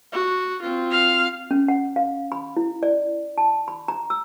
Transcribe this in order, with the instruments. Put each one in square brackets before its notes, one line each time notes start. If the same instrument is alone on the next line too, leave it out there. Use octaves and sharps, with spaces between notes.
[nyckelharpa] F#4
C4 F4
[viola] F5
[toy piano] C#4
F#5
F5
B5
E4
D5
A5
B5
A#5
E6